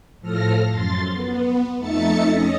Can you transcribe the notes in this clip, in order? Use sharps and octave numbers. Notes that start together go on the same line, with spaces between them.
A2 F3 A4 F6 A#6
F#2 C6 A6
B3
F2 A3 D#4 E5 A6 C#7
C#4 D#5 A#6